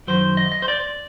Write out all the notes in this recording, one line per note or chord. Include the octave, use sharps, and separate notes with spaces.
F#2 D#3 F#3 C5
D#5
D#5
C5
D5